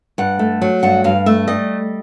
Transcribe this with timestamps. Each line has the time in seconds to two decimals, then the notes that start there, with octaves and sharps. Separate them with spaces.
0.18 G2 F#5
0.39 A3
0.62 F#3
0.83 G2 F#5
1.04 G2 F5
1.26 A3 E5
1.48 G3 D#5